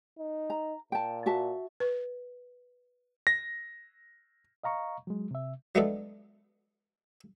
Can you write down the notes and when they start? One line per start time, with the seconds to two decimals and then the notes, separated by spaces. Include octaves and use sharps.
0.19 D#4
0.50 A#5
0.92 A#2 G5 A5
1.26 F#4 E5 A5
1.80 B4
3.27 A#6
4.64 D#5 F5 A#5 C#6
5.07 F#3 G#3
5.31 C3 E5
5.75 F#3 G#3 A3 B3 D4 A4